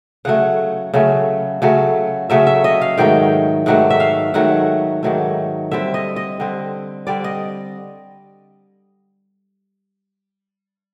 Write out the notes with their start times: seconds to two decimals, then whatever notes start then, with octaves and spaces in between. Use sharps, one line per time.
0.25 C#3 F#3 A3 F#5
0.94 C#3 F#3 A3
1.62 C#3 F#3 A3
2.30 C#3 F#3 A3 E5
2.47 E5
2.64 D#5
2.81 F5
2.98 G#2 D#3 F#3 A3 G5
3.66 G#2 D#3 F#3 A3 F#5
3.90 E5
4.00 F5
4.34 G#2 D#3 F#3 A3 F#5
5.03 G#2 D#3 F#3 A3
5.71 D3 G3 C4 E5
5.94 D#5
6.16 D#5
6.40 D3 G3 C4
7.07 D3 G3 C4 D5
7.24 D#5